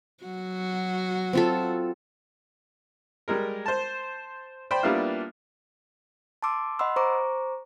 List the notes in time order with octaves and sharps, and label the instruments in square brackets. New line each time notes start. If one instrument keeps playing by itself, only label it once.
[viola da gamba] F#3 F#4
[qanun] C4 F4 A4
[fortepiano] G3 G#3 A#4
C5 A5
C5 D5 G5 B5
G3 A#3 B3 D4 E4 F4
[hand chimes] A5 C6 D6 E6
D#5 F#5 B5 C6 E6
C5 A#5 C#6 D6